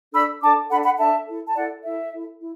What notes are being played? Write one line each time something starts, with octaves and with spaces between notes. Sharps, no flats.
D4 A4 B5 E6
D4 A4 A5 D6
D4 A4 F#5 B5
F#5 B5
D4 A4 E5 A5
E4 A4
A5
E4 A4 D5 F#5
E4 A4 E5
E4 A4
E4